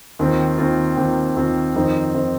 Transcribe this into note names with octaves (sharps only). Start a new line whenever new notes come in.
D#2 D#3 C4 F4
D#2 D#3 C4 F4
D#2 D#3 C4 F4
D#2 D#3 C4 F4
F2 D#3 C4 D#4
D#3 C4 D#4